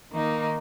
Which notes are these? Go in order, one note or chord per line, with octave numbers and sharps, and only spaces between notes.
D#3 A#3 D#4